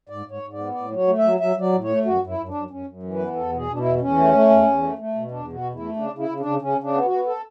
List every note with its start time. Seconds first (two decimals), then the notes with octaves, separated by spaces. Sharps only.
0.09 G#2 D5
0.26 G#2
0.31 C#5
0.42 G#2
0.53 D5
0.58 B3
0.74 A2 D5
0.91 F#3 C#5
1.07 A3
1.18 E5
1.24 F#3
1.40 F#3 E5
1.56 F#3 D5
1.73 A2
1.84 C#5
1.89 A3
2.05 F#2 F#4
2.22 F#2
2.27 E4
2.38 F#2
2.49 D4
2.54 F#2
2.70 F#2 C#4
2.86 F#2
3.03 E3
3.14 B4
3.19 B3
3.36 E2 A4
3.52 B2 G#4
3.68 B2 D4
3.79 E4
3.85 E2
4.01 E2 C#4
4.17 A3
4.33 A3
4.50 E2
4.66 E2
4.83 A3
4.98 A3
5.15 B2
5.31 E2 D4
5.48 B2
5.53 F#4
5.64 E2
5.75 A3 E4
5.96 C#3 D4
6.13 C#3
6.19 E4
6.29 C#3
6.40 D4
6.46 C#3
6.62 C#3 C#4
6.78 C#3
6.84 D4
6.94 B3
7.05 F#4
7.11 B3
7.26 A4